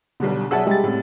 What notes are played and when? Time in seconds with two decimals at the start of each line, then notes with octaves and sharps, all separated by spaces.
0.20 B1 B2 D3 G3
0.51 B1 G#4 D5 E5 F#5 A5 E6
0.67 G3 G#3 G4 A6
0.84 A2 C3